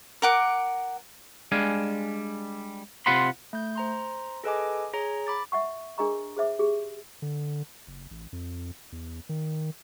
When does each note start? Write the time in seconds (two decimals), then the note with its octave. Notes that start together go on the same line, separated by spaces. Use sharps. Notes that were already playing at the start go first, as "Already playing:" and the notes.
0.22 A#4 F#5 D6
1.52 G3 G#3 D4 F5 G#5
3.06 C3 F4 F#5 B5 C6
3.53 A3 G6
3.76 C5 A#5 C6
4.44 G#4 A4 B4 D#5 G#5 D6
4.94 G#4 C#5 A#5
5.27 B5 D6 A6
5.52 E5 F#5 C#6
5.98 D4 G#4 A#4 D#5 A#5 C#6
6.37 G#4 C5 E5 D6
6.59 G4 G#4
7.22 D3
7.87 F#1
8.11 A1
8.33 F2
8.92 E2
9.29 D#3